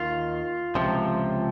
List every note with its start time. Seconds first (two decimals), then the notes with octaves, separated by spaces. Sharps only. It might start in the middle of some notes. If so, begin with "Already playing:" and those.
Already playing: D#2 D#3 F4
0.75 C#2 C3 F3